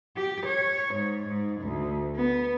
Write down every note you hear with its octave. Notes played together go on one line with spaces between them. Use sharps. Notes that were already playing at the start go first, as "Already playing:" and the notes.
G4
C#5
G#2
G#2
D2
B3